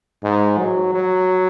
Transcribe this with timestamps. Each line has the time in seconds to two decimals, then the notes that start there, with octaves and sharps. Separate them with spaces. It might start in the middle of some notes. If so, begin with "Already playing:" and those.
0.24 G#2
0.59 F#3
0.95 F#3